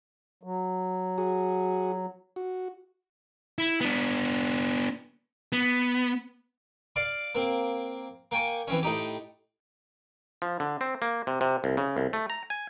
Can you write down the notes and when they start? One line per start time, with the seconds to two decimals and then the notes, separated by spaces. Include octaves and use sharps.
0.43 F#3
1.18 F#4 G#4
2.36 F#4
3.58 E4
3.81 B3 D4
5.52 B3
6.96 D5 F5 C6 D6
7.35 A#3 C4
8.31 A#3 G5 G#5 C#6
8.67 E3 C4 C#4
8.82 A2 D#4 G4
10.42 F3
10.60 D3
10.81 C4
11.02 A#3
11.27 C3
11.41 C3
11.64 C2
11.77 C#3
11.97 C2
12.13 A3
12.30 A#5
12.50 G#5